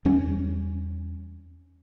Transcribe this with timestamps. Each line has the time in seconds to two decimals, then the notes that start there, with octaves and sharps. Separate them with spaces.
0.05 E2 G3 C#4